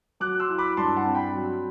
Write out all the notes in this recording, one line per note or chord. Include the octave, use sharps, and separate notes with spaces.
F#3 D6 F#6
C6 E6
E4
B5 D6
G2 A5 C6
F#5 A5
C4
G5 B5
F#3